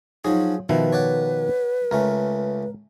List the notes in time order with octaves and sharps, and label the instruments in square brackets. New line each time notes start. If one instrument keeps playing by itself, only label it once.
[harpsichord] F3 F#3 C#4 [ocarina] D#4 [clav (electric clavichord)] G#4
[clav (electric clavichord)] B2 D#3 F3 [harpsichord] E4 [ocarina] B4
[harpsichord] C#5 D5 F#5
[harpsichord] C#2 A3 C#4 [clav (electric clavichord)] A#4